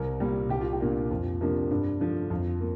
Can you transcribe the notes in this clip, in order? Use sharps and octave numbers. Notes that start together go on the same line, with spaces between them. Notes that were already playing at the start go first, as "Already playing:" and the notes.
Already playing: C2 A#4
A#2 G3
C2 G4
F4
G4
A#2 A#3 D4
F2 F4
C3 F3 A#3 D4
G2 D4
D3 F3 D4
F2 F4
A#3